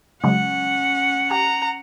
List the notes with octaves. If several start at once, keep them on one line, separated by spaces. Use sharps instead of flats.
C#3 F#3 G#3 C#4 F#5
G4 A#5